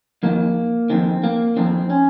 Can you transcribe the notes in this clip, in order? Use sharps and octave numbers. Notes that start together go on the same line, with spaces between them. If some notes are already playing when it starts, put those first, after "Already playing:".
F2 D#3 A#3
F2 D#3 C4
A#3
F2 D#3 C4
C#4